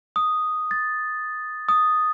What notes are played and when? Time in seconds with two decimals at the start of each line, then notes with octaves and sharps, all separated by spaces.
0.16 D#6
0.71 A6
1.69 D#6